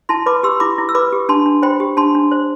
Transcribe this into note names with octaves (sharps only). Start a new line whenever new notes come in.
E4 A5 C6
B4 B5 D6
G4 C6 E6
E4 B5 D6
E4
E6
B4 B5 D6
G4
D4 A5 C6
D4
C5 G5 B5
G4
D4 A5 C6
D4
C5